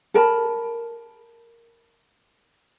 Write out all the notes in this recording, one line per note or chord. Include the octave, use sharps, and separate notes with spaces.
A4 A#4 A5 B5